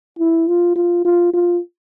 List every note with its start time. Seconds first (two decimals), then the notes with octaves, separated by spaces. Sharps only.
0.19 E4
0.48 F4
0.76 F4
1.05 F4
1.33 F4